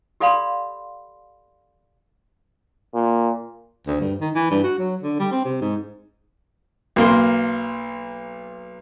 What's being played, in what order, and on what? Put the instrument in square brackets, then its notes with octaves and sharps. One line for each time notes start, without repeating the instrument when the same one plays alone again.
[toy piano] G4 A4 D5 F5 B5 C6
[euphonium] A#2
[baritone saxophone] D2
G2
D#3
E3
G2
F#4
F#3
D3
G3
C4
C3
G#2
[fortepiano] B1 A#3 C6